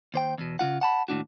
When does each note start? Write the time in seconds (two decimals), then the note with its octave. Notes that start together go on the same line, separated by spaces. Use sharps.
0.14 D#2 C5 G5
0.38 E2 B2
0.59 C#3 F3 F4 F#5
0.81 F#5 A5 B5
1.08 D#2 A2 D4 F#4